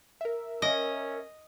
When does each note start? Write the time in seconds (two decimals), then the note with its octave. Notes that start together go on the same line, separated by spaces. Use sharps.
0.21 A#4 E5
0.62 C#4 D#5